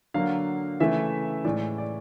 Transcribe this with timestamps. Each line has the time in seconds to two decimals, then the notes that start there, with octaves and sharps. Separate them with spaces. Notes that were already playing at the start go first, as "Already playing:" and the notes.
0.14 D3 F#3 A#3 F5
0.80 C#3 E3 A3 E5
1.45 A2 E3 G#3 D5
1.78 D5